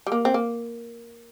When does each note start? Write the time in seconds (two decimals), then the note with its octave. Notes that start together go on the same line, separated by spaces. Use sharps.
0.07 G3
0.12 A#3
0.25 C4
0.34 A#3